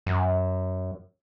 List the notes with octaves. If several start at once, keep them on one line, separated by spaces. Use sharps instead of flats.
F#2